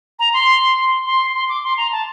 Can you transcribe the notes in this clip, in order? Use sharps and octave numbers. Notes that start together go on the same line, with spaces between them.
A#5
C6
C6
C6
D6
C6
A#5
A5